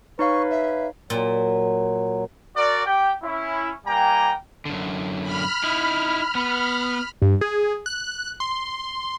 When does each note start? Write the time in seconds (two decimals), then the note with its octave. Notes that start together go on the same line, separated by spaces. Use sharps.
0.19 D#4 B4 C#5 F5 C#6
0.50 E5
1.10 A#2 F#3
2.55 F#4 A#4 D5
2.86 G4 G5
3.23 C#4 E4
3.86 G3 A#3 G5 G#5 A#5
4.65 F#2 D3
5.22 B5 F6
5.64 D#4 E4
6.35 B3
7.22 G2
7.41 G#4
7.86 F#6
8.40 C6